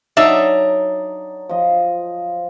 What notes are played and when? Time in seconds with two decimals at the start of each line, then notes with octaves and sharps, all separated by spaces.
0.17 F#3 D4 D#4 E5
1.49 F3 D#5